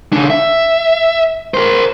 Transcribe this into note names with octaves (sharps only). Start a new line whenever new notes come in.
C#3 D4
E5
A#4 C5